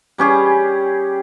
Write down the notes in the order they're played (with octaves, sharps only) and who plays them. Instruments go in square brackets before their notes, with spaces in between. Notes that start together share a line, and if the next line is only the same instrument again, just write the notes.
[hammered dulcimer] G3 C#4 G4 G#4